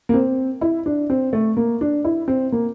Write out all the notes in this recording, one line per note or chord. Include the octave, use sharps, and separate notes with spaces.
A#3
C4
E4
D4
C4
A3
A#3
D4
E4
C4
A#3